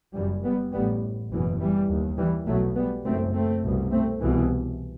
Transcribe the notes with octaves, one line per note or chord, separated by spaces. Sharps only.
F#1 F#2 E3 G3
G3 B3
A1 A2 G3 B3
F#1 E2 B2 E3
E3 G3
D#2
E3 G3
B1 B2 F#3 A3
G3 B3
F#1 F#2 A3 C4
A3 C4
C2 B2
A3 C4
C2 B2 E3